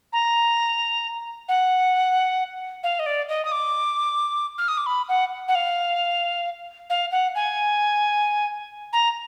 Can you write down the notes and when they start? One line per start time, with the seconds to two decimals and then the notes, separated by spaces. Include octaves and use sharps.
0.13 A#5
1.49 F#5
2.83 F5
2.99 D#5
3.06 D5
3.29 D#5
3.45 D#6
3.52 D6
4.58 F6
4.68 D#6
4.77 D6
4.86 B5
5.09 F#5
5.48 F#5
5.55 F5
6.90 F5
7.12 F#5
7.35 G#5
8.93 A#5